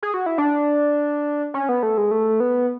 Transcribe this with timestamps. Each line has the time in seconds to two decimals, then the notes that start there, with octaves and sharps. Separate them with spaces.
0.03 G#4
0.14 F#4
0.26 E4
0.38 D4
1.54 C#4
1.69 B3
1.83 A3
1.98 G#3
2.11 A3
2.40 B3